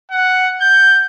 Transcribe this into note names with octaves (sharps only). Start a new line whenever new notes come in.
F#5
G6